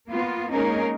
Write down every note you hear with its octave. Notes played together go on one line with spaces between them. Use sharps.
A#3 B3 F4
G#3 A#3 C#4 D#4 G#4 A#4